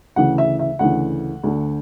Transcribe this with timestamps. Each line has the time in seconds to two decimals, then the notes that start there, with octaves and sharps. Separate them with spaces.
0.16 D2 C#3 E3 F#5
0.38 E5
0.59 E5
0.79 D2 C#3 E3 F#5
1.43 D2 D3